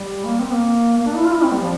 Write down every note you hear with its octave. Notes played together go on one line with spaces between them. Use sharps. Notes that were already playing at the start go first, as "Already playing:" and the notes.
Already playing: G3
A#3
C4
A#3
A#3
D4
E4
F4
E4
C4
G3
F3